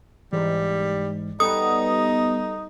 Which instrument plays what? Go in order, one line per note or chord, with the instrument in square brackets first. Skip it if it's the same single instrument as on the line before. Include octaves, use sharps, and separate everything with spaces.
[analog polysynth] G#2 [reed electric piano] E3 [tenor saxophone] G3
[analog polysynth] G3 B3 [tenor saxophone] D#4 [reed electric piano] A4 [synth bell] D#6